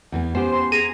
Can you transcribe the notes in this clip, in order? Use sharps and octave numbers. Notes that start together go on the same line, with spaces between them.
E2 E3 B3
B3 C#4 G4 C5
C6
G#4 A#5 D#7